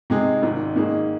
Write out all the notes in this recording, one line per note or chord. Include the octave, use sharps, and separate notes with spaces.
C3 G#3 D#4 G#4
G#1 G#2 D#3
G#2 D#3 A#3 D#4 G#4